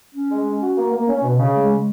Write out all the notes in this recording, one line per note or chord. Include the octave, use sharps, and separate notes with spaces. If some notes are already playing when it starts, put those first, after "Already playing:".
C#4
G#3
C#4
F#4
A#3
A#3
C#4
B2
C#3
G#3
G#3